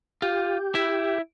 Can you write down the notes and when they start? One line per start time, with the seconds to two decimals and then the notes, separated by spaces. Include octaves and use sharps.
0.22 F4 G4
0.75 E4 E5